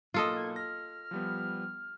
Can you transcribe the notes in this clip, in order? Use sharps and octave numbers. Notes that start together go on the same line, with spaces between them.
B1 A#3 F4 A4 D#5
G#6
F6 A#6
F3 G3 B3